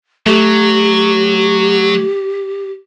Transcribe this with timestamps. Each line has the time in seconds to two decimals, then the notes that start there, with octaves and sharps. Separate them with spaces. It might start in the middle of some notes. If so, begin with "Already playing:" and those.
0.26 F#3 A3 G4